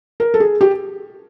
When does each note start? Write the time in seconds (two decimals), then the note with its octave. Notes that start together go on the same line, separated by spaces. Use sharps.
0.20 A#4
0.34 A4
0.40 G#4
0.61 G4